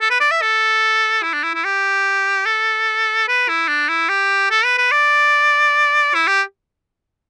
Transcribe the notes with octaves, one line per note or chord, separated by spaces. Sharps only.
A4
B4
D5
E5
A4
E4
D4
E4
E4
G4
A4
B4
E4
D4
E4
G4
A4
B4
B4
D5
E4
G4